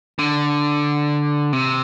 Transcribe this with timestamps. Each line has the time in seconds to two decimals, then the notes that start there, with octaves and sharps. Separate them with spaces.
0.19 D3
1.53 C3